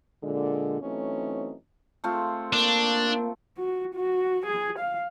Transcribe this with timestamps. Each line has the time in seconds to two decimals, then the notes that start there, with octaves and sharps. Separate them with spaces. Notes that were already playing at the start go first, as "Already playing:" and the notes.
0.23 A#2 D3 G#3
0.81 E3 F#3 A3 C4 C#4 D#4
2.04 A3 C4 F4
2.53 A#3 D4
3.58 F#4
3.95 F#4
4.46 G#4
4.79 F5